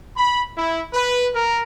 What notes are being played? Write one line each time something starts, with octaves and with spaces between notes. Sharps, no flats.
B5
E4
B4
A#4